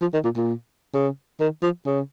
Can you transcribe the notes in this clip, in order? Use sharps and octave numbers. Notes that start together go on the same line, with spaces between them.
F3
D#3
A#2
A#2
C#3
D#3
F3
C#3